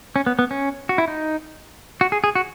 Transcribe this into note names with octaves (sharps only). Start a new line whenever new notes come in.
C#4
B3
B3
C#4
F#4
E4
D#4
F#4
G#4
G#4
F#4